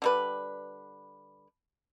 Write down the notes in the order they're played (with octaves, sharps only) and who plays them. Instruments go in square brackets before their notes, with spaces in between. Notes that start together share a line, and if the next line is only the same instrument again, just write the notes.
[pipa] D3 G3 B4